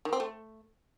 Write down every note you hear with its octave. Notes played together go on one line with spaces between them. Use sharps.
D#3
C4
A3